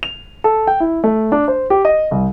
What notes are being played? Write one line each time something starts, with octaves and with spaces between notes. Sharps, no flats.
F7
A4
G5
E4
A3
D4
C5
G4
D#5
C2